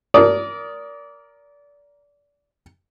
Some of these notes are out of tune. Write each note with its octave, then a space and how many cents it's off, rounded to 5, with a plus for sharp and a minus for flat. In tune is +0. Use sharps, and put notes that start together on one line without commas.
A#4 +5 D5 -25 D#6 +0